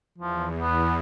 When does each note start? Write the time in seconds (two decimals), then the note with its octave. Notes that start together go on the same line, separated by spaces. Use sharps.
0.18 E2 F3
0.60 B3